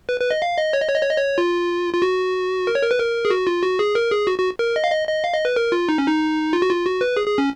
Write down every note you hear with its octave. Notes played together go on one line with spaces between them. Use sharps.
B4
B4
D#5
F5
D#5
C#5
D#5
C#5
D#5
C#5
D#5
C#5
F4
F4
F#4
A#4
C#5
A#4
B4
A#4
G#4
F#4
F4
F#4
G#4
A#4
G#4
F#4
F#4
A#4
D#5
F5
D#5
D#5
F5
D#5
B4
A#4
F4
D#4
C#4
D#4
F4
F#4
F4
F#4
B4
G#4
G#4
C#4